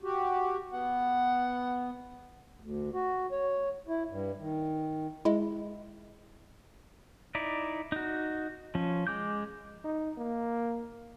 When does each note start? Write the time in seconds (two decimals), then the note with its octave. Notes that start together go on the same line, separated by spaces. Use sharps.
0.02 F#4 G4
0.71 B3 F#5
2.60 D2
2.94 F#4
3.31 C#5
3.88 E4
4.08 G2
4.39 D#3
5.25 G#3 E4
7.35 D#4 E4 D5
7.92 D#4 F#4
8.75 F3 C#4
9.07 G#3 D6 G6
9.84 D#4
10.18 A#3